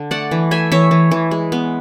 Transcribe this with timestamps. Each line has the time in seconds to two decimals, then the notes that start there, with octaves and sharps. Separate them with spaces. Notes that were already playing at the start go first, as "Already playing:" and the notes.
Already playing: D3
0.11 A3 D5 F#5
0.31 E3
0.51 A3 E5 G#5
0.72 E3 C#5 E5
0.91 E3
1.11 E3
1.31 G#3
1.52 B3